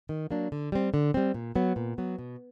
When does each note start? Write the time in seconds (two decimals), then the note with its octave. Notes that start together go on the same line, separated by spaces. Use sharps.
0.09 D#3
0.31 F#3 A#3 D4
0.52 D3
0.72 G3 C4
0.94 D3
1.14 G3 C4
1.34 A#2
1.55 F#3 B3
1.76 A#2
1.98 F#3 B3
2.19 B2